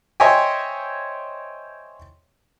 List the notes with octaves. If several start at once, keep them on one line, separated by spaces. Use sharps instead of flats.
C5 C#5 D#5 E5 G5 G#5